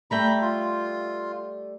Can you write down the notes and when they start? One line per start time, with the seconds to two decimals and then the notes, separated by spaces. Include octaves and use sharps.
0.11 G3 A3 G5 A#5 B5
0.41 F4